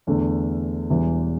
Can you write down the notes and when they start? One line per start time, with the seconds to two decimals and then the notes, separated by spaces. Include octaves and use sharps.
0.07 E2 D3 A3
0.89 E1 E2 E3 G3